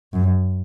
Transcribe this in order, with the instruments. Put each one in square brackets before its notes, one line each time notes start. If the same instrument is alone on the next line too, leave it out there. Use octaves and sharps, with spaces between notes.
[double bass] F#2